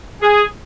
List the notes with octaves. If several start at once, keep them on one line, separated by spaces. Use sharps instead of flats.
G#4